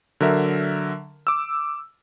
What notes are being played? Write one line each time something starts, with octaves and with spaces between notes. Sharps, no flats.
D3 F#3 A#4 E5
D6 E6